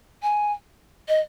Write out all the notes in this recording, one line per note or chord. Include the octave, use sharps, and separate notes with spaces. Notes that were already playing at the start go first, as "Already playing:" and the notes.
G#5
D#5